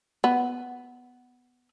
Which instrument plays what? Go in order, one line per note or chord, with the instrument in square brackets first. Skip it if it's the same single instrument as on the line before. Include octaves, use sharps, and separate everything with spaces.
[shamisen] B3